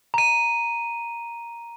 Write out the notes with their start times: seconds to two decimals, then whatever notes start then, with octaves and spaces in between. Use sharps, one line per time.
0.14 A#5 D#7